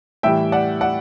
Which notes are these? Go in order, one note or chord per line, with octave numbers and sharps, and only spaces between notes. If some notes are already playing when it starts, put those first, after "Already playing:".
A2 E3 G3 E5 G5
D5 F#5
D5 F#5